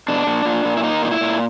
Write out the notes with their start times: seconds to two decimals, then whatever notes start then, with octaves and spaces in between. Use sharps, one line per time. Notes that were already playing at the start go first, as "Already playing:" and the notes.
0.08 B2 D4
0.27 A#2
0.45 A#2
0.65 A#2
0.77 E4
0.83 A#3 D#4
1.02 A#2 D#4
1.11 E4
1.21 A#2